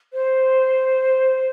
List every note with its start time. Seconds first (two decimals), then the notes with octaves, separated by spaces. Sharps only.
0.13 C5